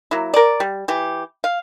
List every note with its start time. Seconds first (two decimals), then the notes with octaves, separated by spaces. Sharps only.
0.11 F#3 A#3 E4
0.34 A#4 D5
0.60 G3
0.88 E3 G4
1.44 F5